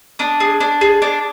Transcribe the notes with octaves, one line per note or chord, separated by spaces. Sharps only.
D4 D#6
G#4
D4
G#4
D4